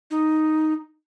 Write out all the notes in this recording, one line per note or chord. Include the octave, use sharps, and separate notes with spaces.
D#4